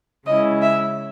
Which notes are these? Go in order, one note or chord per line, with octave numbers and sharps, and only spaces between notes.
C#3 G#3 C#4 E4 D#5
E5